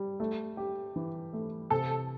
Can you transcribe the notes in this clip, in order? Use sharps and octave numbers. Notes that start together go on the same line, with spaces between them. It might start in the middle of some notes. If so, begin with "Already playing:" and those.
Already playing: G3
A3
G4
E3
A3
C3 A4